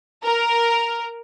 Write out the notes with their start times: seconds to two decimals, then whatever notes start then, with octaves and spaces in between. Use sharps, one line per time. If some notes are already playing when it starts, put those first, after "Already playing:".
0.24 A#4